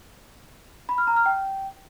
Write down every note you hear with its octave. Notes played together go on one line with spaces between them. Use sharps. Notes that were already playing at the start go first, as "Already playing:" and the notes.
B5
F6
A#5
F6
G5